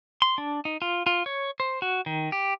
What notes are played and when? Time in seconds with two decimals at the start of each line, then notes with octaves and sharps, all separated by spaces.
0.22 C6
0.38 D4
0.65 D#4
0.82 F4
1.06 F4
1.26 C#5
1.60 C5
1.82 F#4
2.06 D#3
2.32 G4